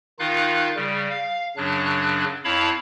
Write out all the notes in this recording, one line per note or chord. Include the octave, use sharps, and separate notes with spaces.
D#3 D#4 F4 F5 F#6
C#3 G3
F5
F#2 C#3 F#3 D4 F#6
F2 E4 C#5 F5 A5 B5